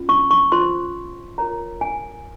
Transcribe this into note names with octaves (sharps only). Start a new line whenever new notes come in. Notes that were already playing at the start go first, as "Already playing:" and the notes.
Already playing: C#4 F4
C#6
C#6
F4 C5 C6
F4 A#4 C#5 A#5
G#5